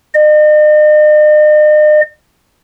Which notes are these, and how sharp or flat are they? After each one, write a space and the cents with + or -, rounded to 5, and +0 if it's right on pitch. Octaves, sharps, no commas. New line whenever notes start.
D#5 -45